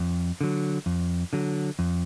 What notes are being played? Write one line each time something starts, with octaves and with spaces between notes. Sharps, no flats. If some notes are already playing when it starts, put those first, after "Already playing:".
Already playing: F2
D3 F#3
F2
D3 F#3
F2